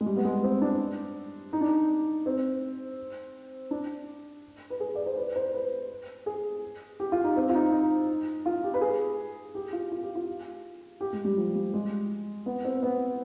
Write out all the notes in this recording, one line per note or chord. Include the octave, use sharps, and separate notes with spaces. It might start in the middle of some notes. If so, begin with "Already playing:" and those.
G#3
G3
B3
G#3
C4
D4
D#4
D4
D#4
C4
D4
B4
G#4
D5
C5
B4
C5
B4
G#4
G4
F4
D#4
C4
F4
D#4
D#4
F4
G4
B4
G#4
G4
F4
F4
G4
F4
G4
G#3
G3
F3
G3
G#3
B3
C4
B3